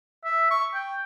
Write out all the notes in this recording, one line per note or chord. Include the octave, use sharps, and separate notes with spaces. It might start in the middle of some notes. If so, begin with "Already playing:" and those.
E5
C#6
G5